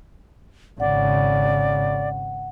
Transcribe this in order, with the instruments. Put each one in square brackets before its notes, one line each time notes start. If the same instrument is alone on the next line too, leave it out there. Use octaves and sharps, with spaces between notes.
[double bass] G#1 C#3 [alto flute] D5 [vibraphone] F#5